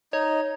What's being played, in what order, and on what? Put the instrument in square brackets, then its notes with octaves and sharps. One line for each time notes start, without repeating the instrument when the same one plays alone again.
[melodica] D#4 [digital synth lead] C#5